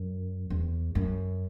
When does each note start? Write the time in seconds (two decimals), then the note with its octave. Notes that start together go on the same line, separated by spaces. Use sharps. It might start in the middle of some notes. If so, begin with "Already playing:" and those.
Already playing: F#2
0.50 E2
0.95 F#2